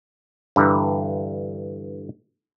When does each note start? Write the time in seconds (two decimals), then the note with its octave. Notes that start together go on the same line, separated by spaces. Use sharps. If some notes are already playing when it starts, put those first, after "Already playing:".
0.56 G2 D3 E3 A#5